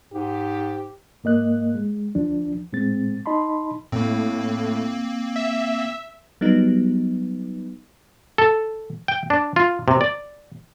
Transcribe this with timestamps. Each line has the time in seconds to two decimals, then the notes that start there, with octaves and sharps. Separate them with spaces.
0.13 G#2 G4
1.24 G#2 A#3 D#5 F#6
1.74 G#3
2.15 D2 F3 D4
2.73 A2 G#3 C4 A6
3.26 D#4 D#5 A5 B5 C6
3.92 A2 A#3 C4
5.36 E5
6.41 F#3 G3 B3 D#4
8.38 A4
9.08 G5
9.30 D4
9.56 F4
9.88 C3
10.01 D5